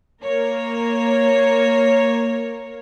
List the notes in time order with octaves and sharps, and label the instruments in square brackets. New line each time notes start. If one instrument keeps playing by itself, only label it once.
[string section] A#3 A#4 C#5